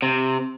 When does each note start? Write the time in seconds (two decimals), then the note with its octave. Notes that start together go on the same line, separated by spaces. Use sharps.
0.02 C3